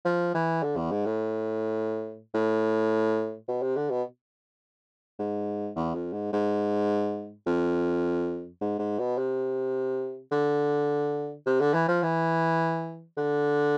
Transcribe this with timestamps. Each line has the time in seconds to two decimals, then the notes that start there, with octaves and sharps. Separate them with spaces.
0.05 F3
0.35 E3
0.63 D3
0.77 E2
0.92 G#2
1.05 A2
2.34 A2
3.48 B2
3.62 C3
3.76 D3
3.90 B2
5.19 G#2
5.76 E2
5.95 F2
6.13 G#2
6.33 G#2
7.47 F2
8.61 G#2
8.79 G#2
8.99 B2
9.18 C3
10.32 D3
11.46 C3
11.60 D3
11.74 E3
11.88 F3
12.03 E3
13.17 D3